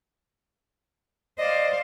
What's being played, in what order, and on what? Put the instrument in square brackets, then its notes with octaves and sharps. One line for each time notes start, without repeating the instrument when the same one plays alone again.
[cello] C5 F5 [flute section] D5 [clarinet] D#5